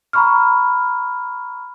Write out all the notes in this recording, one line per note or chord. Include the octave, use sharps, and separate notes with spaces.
A#5 B5 C#6 F6